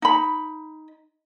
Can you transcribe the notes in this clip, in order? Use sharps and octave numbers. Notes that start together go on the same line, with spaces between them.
D#4 B5